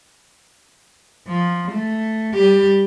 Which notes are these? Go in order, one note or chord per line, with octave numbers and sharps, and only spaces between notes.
F3
A3
G3 G4